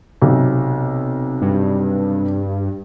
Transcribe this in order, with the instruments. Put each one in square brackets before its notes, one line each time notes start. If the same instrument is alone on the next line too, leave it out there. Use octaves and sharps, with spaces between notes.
[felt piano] B1 C3
[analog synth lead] G2